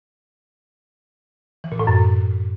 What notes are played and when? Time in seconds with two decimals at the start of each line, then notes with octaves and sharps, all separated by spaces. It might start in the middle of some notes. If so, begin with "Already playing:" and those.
1.64 E3
1.72 A#2
1.79 A2
1.87 F#2